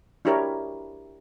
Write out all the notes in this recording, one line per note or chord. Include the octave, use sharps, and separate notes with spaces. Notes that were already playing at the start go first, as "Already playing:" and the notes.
D4 E4 F#4 G4 A#4 C#5